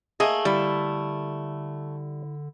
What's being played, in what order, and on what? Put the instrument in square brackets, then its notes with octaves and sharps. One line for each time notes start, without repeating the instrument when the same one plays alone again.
[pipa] A3 A#3 D#5 [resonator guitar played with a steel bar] G#4
[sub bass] D3 [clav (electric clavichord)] G3 A5 [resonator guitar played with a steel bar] E4